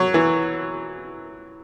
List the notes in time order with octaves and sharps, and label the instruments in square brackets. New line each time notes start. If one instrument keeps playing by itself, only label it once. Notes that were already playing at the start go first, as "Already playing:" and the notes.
Already playing: [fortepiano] F#3
E3